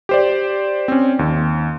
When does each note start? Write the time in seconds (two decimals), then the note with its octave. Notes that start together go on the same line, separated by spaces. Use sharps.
0.09 G4 C5 D5
0.88 C4 C#4
1.19 D#2